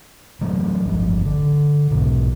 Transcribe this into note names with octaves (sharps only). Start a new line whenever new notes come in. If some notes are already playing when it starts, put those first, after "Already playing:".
A2 E3 F#3 A3
D1 G1 F3
D3
B1 G#2 B2